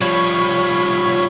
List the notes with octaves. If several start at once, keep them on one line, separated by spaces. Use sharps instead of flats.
F3 G3 C#5 B5 G#6